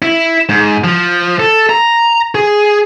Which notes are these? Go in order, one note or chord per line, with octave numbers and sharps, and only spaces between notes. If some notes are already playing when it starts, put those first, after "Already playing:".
E4
G#2
F3
A4
A#5
G#4